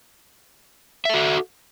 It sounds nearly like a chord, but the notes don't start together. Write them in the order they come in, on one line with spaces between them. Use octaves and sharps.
E5 A4 F#4